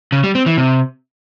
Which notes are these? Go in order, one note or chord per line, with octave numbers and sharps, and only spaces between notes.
C#3
G3
C4
E3
C3